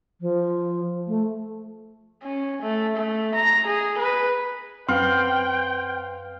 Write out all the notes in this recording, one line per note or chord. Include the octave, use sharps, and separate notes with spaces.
F3
A3
C#4
A3
A3
A#5
G#4
B4
F#2 C4 B4 F5 G5 C6 F6